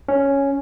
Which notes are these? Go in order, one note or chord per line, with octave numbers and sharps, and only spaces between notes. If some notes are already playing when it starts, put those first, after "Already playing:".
C#4